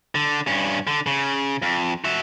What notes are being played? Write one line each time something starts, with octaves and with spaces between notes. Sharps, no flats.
D3
G2 C#4
D3
C#3
F2
F#4 E5